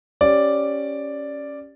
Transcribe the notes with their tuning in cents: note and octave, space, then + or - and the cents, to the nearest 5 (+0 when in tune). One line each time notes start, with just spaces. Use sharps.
C#4 +0 G4 +0 D5 +0